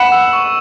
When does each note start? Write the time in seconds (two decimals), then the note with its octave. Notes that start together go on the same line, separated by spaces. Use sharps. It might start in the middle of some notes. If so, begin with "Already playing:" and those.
Already playing: F#5 B5 E7
0.12 E6
0.33 C#6